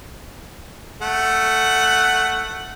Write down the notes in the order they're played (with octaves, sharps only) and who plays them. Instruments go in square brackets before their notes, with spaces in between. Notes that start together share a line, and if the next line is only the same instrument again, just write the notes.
[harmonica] A3 F#5